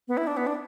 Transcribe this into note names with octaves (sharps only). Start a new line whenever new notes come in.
B3
E4
D4
B3
D4